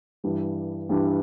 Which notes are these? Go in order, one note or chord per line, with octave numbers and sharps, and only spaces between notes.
G2 E3 G3 D4
G2 E3 G3 D4